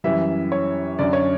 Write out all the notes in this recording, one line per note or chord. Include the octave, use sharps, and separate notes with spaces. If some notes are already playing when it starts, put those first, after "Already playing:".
F#2 E3 G3 E5
C#5
F#2 D3 F#3 D5
C#5